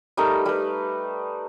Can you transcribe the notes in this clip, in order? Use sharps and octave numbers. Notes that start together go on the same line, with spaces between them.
G3 A3 D#4 A#4
G3 B4